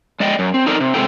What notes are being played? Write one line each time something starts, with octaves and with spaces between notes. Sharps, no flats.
G#3 D5 D#5 G5
F#2
C4
D#4 A4 A#4 D5
C3
C3 G#3 A#3 E4 A4 G5